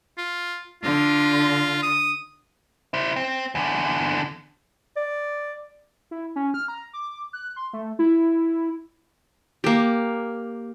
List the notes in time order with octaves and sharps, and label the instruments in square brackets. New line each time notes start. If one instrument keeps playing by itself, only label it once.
[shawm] F4
[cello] D3 [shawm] F4
[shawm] D#6
[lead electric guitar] E4 C5
C4
E2 D3
[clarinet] D5
[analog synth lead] E4
C#4
F6
A#5
D6
F#6
C6
A3
E4
[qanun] A#3 G4